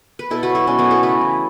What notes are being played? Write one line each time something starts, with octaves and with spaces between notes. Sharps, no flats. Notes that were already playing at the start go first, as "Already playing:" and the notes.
B4
B2 E4 A4
F#4 B4
F#3
E4 A4
B2 C#4
B3 E4
A3
E4 A4
C#3 F#4 B4
E3